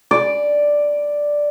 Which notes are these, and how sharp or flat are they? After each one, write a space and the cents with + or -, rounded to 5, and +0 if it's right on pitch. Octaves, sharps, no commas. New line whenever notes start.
D5 +0